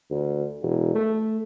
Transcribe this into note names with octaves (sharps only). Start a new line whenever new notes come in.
D2
E1
A3